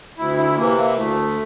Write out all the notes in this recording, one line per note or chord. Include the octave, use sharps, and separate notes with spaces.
D2 E4
E4
C3 E3 A#3
A#3
D2 A3